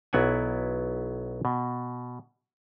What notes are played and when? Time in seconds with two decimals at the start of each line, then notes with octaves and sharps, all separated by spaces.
0.13 B1 F#3 B3 E4 F#5 G#5
1.45 B2